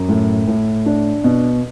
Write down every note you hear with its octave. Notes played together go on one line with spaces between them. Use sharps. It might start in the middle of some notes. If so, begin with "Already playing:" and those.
Already playing: F#2
A2
A2
D4
B2